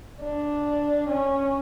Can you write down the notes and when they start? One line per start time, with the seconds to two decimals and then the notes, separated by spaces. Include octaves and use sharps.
0.22 D4
1.09 C#4